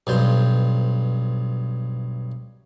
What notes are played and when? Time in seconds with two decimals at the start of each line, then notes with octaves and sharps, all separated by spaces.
0.07 B1 G2 C5